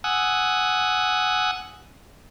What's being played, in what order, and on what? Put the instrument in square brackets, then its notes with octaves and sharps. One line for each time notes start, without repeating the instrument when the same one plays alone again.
[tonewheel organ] F#5 G#5 D#6 E6 F#6